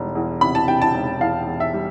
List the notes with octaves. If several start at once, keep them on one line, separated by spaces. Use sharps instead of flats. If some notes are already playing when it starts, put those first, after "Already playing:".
Already playing: E1 G3
E2
C3 B5
A5
C3 G5
A5
E1
E2 F5
E2
E5
G3